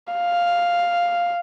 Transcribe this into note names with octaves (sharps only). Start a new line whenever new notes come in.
F5